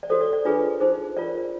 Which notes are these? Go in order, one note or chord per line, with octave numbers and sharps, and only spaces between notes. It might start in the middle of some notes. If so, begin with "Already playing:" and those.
D5
F#4 A4 C5 C#5
D5
D5
D4 F4 G#4 B4 C#5
D#4 G#4 C5
F4 A#4 C#5 D5